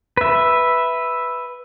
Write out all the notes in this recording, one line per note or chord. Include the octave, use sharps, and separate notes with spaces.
B4 E5